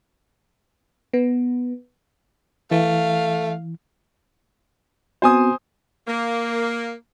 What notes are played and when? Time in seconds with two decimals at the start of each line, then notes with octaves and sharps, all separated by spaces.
1.13 B3
2.71 E3 A3 F5
5.22 B3 C4 F#4 C5 G#5 D#6
6.07 A#3